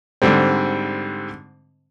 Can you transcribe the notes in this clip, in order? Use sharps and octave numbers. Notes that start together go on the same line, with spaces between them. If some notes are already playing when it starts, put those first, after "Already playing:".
G#2 D3 G3 C4